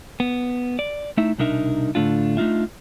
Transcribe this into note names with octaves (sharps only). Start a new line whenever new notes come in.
B3
D5
A3 D#4 E4 E5
C2 B2 D4 D#4 A#4 E5
A2 D3 A3 D4 F4
A3 D4 D#4 F4 E5